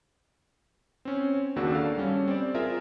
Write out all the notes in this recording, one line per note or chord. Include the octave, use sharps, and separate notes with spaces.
C4 C#4
D#2 C#3 A#3 D4 F#4 E6
A4 D5 F5
G3 C#4
C4 D5
F4 G#4 A#4 E5